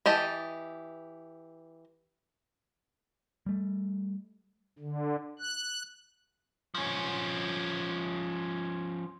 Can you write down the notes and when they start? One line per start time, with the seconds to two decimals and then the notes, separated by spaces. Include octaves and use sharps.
0.06 E3 G4 D#5 A5
3.46 G3 A3
4.79 D3
5.39 F#6
6.75 F3 C#4